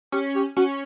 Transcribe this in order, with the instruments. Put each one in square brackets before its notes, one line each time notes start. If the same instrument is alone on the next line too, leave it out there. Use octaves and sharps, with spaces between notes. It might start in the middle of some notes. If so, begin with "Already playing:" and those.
[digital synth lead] C#4 [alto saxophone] G4
[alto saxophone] G4
[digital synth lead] C#4 [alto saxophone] F#4